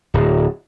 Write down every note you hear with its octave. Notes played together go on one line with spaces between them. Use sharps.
D1